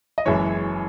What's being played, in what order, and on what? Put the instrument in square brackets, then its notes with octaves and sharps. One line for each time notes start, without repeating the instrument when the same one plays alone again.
[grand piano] D#5
F#1 F#2 E3 G#3 C#5 E5